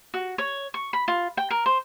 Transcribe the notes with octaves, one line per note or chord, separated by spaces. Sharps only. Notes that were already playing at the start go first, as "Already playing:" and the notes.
F#4
C#5
C#6
B5
F4
G5
A#4
C5